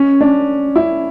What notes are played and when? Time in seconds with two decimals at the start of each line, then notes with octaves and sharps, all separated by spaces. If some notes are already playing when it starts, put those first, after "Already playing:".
Already playing: C#4
0.21 D4
0.76 E4